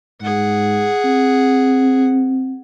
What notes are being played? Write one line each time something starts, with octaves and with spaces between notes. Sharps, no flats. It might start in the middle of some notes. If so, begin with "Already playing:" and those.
G#2 G#4 F#5
C4